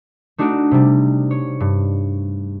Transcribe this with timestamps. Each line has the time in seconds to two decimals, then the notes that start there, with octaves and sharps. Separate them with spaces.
0.38 A3 D4 D#4 F#4 D5
0.71 C3 G3
1.31 C#5
1.60 G2